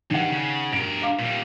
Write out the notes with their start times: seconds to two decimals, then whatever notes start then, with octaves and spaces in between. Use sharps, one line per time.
0.11 G2 D#3 G3 F#5
0.30 C#3
0.73 G2 A#4 D7
1.02 F5 D6
1.19 A#2 G3